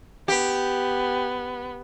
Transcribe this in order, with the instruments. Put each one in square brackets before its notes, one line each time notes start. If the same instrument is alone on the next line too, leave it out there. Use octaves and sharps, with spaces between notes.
[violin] B3 [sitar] G4